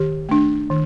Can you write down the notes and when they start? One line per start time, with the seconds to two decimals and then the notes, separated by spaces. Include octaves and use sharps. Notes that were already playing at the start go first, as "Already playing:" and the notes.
Already playing: D#3 G4
0.29 A3 D4
0.70 D#3